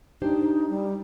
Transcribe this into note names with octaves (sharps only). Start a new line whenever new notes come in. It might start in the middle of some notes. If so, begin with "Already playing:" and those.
D4 D#4 G4 C5
G3